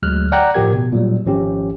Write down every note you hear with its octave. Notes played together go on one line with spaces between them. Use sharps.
G1 D2 F#3 G#3 F6 F#6
D5 F#5 G5 A#5 F#6
G1 A2 F3 G4 A#4 G#6
B2
A#2 F#3 G3
G#1 F3 C#4 G4